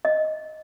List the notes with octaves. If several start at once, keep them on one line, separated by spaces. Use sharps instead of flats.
D#5